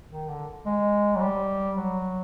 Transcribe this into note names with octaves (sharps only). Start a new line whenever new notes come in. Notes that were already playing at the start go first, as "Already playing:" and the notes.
D#3
D3
G#3
F#3
G3
F#3